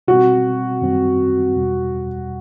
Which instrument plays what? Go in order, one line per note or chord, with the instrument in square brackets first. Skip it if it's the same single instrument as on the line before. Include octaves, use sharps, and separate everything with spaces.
[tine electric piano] B2 G3 C4 [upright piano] F#4
[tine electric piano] F#2 D#3 G3 C4
E2 B2 G3